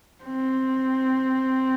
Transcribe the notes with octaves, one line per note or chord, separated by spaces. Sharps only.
C4